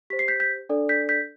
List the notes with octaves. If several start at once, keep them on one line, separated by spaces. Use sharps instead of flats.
G4 C5 B6
C7
G6 B6
G6 B6
D4 A4 D5
G6 B6
G6 B6